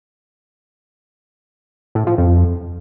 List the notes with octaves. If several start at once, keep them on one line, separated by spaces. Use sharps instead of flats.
A2
F3
F2